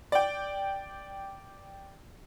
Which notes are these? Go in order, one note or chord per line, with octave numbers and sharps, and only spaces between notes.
D5 G5